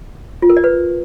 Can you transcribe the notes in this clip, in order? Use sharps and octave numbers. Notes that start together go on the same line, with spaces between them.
F4
A#4
D5
B4